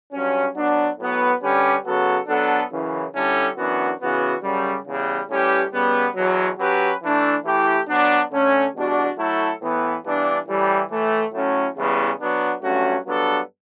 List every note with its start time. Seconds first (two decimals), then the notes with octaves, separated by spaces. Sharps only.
0.12 G2 F#3 C#4
0.55 F#3 B3 D4
0.99 A2 F#3 B3
1.42 D3 G3 C#4 G4 B4
1.85 C#3 F#3 B3 F#4 A4
2.27 F#3 B3 D4 A4
2.71 F#2 C#3 E3
3.15 D3 G3 C#4 E4 A4
3.57 F#2 E3 B3 D4 F#4
4.01 C#3 E3 B3 F#4
4.43 F#2 C#3 G3
4.87 E2 C#3 G3
5.29 A2 G3 C#4 G4 B4
5.73 C#3 G3 B3
6.16 E2 B2 F#3
6.59 F#3 C#4 G4 B4
7.02 E3 A3 D4
7.45 E3 A3 E4 G4
7.88 F#3 B3 D4
8.32 D3 A3 C#4
8.74 E2 B2 G3 D4 F#4
9.18 F#3 A3 E4 A4
9.61 A2 E3 B3
10.04 G2 E3 B3 D4
10.47 A2 E3 G3
10.90 A2 E3 A3
11.33 A2 F#3 A3 C#4
11.76 E2 C#3 E3 G3 B3
12.20 F#3 B3 D4
12.63 G2 F#3 A3 C#4 F#4
13.06 G2 F#3 B3 D4 A4